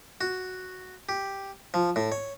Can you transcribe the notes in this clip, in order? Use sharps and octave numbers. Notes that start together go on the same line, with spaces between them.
F#4
G4
F3
A2
C#5